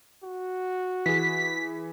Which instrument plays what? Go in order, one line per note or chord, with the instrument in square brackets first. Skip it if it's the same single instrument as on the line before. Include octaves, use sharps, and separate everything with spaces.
[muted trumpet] F#4
[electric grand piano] E3 G#4 [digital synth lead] B6